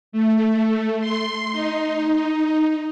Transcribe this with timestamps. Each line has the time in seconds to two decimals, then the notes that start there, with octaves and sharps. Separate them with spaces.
0.12 A3
1.00 C6
1.52 D#4